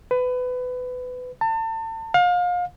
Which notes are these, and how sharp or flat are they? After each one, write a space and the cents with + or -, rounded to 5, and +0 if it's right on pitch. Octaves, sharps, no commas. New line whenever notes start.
B4 +25
A5 +35
F5 +30